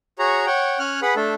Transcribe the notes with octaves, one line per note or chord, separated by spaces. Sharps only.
F#4 G#4 C#5 A#5
C#5 F#5 G5
C#4 C#5 F6 F#6
G#4 B4 F#5 B5
A3 D4 A4